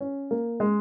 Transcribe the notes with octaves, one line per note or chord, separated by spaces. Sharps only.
C#4
A#3
G#3